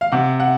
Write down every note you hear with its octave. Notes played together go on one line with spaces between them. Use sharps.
F5
C3 F#5
F#5